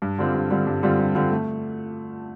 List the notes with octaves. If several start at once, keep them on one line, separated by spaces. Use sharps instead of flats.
G2
D3 G3 C4 F4
G2
D3 G3 C4 F4
G2
D3 G3 C4 F4
G2
D3 G3 C4 F4
A3